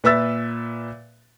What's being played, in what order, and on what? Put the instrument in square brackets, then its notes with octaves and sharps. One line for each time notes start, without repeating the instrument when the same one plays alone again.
[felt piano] A#2 B4 E5 E6 A6